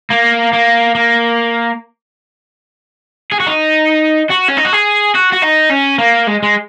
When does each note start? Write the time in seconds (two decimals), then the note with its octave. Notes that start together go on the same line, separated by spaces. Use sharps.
0.10 A#3
0.53 A#3
0.95 A#3
3.32 G#4
3.40 F#4
3.47 D#4
4.30 F#4
4.48 C#4
4.57 D#4
4.64 F#4
4.72 G#4
5.15 F#4
5.33 F#4
5.43 D#4
5.70 C#4
5.98 A#3
6.27 G#3
6.43 G#3